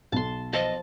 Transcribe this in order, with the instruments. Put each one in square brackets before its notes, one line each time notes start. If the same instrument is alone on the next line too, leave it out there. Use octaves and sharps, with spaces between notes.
[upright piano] B1 [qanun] A5 C6
[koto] B2 F3 A4 [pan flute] D#5 [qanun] A5